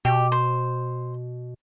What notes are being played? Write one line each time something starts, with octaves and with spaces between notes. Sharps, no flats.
B2 G4
C5